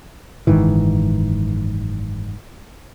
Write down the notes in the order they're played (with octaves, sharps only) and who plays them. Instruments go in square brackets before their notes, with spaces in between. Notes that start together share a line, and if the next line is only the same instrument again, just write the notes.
[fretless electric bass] F#1 G#2 D#3 E3